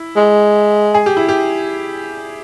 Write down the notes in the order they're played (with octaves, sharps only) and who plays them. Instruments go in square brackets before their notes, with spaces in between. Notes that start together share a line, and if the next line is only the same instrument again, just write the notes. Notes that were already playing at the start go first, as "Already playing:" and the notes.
Already playing: [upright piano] E4
[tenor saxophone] G#3
[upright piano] G#4
G4
E4
G4